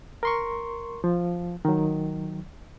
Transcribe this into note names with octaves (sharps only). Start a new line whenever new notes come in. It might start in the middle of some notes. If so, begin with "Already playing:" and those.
A#4 C6 C#6
F3
D#3 F#3